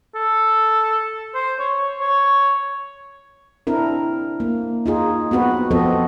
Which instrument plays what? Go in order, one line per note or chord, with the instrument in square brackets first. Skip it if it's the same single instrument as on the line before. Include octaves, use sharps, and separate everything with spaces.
[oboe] A4
C5
C#5
C#5
[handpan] C4 D4 E4 A#4
A#3
D#4 F4 G#4
B3 C4 F#4 B4
F3 B3 C4 A4 D#5